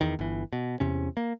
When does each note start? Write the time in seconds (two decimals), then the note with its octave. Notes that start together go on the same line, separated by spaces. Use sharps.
0.01 E2 D#3
0.19 G1 E3
0.53 B2
0.80 E2 C3 C#4
1.17 A#3